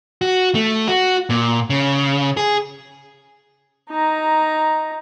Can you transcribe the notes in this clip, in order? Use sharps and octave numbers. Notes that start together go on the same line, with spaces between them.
F#4
A3
F#4
A#2
C#3
G#4
D#4 A#5